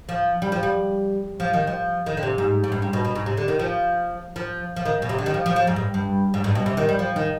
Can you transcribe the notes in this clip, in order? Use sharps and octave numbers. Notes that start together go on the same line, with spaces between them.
F3
G3
F3
G3
F3
D#3
F3
D#3
D3
C3
G#2
G#2
G2
G#2
B2
B2
G#2
C3
D3
D#3
F3
F3
F3
D#3
B2
C3
D3
D#3
F3
F3
F3
G#2
G2
G2
G#2
G2
B2
C3
D#3
G3
F3
D#3